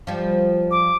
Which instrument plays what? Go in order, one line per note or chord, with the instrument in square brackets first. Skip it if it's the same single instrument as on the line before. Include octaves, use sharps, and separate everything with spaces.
[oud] F3 G3
[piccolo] D6